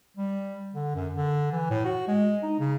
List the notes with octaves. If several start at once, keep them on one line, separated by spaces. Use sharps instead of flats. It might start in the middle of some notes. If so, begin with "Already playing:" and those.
G3
D3
F#2
D3
E3
A2
F#4
G#3
D#4
C#3